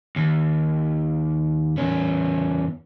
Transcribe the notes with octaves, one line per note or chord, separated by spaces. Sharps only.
D#2
E2 C#4